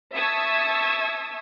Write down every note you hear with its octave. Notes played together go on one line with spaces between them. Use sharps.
E5 A5 C#6 D#6 E6 G#6